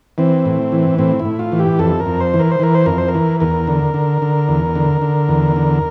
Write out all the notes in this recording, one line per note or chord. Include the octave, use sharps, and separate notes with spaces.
E3 C4
A2
E3
A2 C4
E4
A2
F4
E3
G4
F2 A4
A#4
F2
C5
E3
A#4
C5
E3 A#4
C5
F2 A#4
C5
A#4
E3
E2 A#4
D3
D3
D3
E2
D3
D3
E2
D3